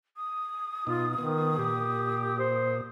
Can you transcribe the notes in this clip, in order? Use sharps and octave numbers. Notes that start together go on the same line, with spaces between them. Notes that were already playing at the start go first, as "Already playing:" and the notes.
D#6
B2 D#4 F4
D#3 B3
A#2 G4
C5